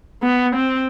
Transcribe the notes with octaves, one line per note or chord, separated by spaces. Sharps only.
B3
C4